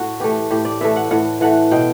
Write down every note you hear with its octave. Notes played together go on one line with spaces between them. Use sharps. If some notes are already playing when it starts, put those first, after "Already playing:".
Already playing: A2 F#4
E3 A3 G4
A2 G4
D5
E3 A3 E5
F#5
A2 F#5
E3 A3 F#5
B2 G5